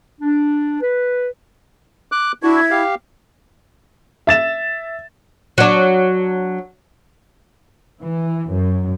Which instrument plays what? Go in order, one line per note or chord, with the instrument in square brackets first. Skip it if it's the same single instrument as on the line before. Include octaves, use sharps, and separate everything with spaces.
[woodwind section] D4
B4
[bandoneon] D6 F#6
[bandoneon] D4 F#4 [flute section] E4 G#6
[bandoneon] G4 F5
[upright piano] E5 A6 E7
[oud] F#3 D4
[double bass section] E3
F#2